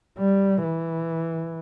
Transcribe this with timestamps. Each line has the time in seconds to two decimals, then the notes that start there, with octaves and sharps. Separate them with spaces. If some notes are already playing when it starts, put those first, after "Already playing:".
0.19 G3
0.63 E3